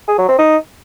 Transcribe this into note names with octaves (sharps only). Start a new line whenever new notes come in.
G#4
F#3
C4
D#4